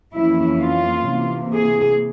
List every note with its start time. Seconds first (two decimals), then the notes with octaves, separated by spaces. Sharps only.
0.13 F2 E3 A#3 C#4 E4
0.61 F4
1.08 C3 E3 A#3
1.54 G#4